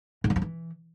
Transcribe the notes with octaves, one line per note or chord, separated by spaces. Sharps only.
G#2
G3
F3
E3